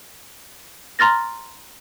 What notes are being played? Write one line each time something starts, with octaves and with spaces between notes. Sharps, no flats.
A#5 C6 F6 A6 A#6